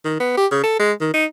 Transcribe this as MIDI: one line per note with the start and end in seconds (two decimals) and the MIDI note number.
0.05 0.16 51
0.20 0.36 59
0.37 0.46 67
0.51 0.62 49
0.64 0.79 69
0.80 0.92 56
1.00 1.12 51
1.14 1.25 63